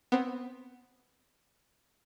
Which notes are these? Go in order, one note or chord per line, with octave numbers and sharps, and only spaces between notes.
B3 C4